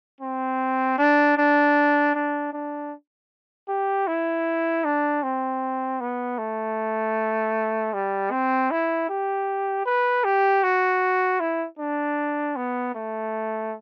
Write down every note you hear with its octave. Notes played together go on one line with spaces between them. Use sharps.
C4
D4
D4
D4
D4
G4
E4
D4
C4
B3
A3
G3
C4
E4
G4
B4
G4
F#4
E4
D4
B3
A3